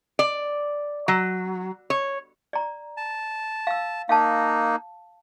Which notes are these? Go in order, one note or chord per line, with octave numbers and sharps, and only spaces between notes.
D5
F#3
C#5
D5 A#5
A5
F5 E6
A#3 D#4 F5 A5